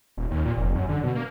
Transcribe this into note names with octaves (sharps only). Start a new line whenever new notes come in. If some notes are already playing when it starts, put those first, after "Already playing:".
D#1
D#2
A#2
F1
F#2
D3
B2
A#3